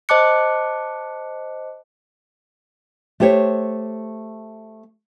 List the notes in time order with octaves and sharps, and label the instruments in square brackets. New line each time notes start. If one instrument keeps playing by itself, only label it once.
[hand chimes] C5 D#5 A5 D6 F#6 C#7
[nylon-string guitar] A3 G4 C5 C#5